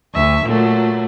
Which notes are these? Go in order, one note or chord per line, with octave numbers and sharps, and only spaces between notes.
D2 E5 C#6
A#2 F#3 A3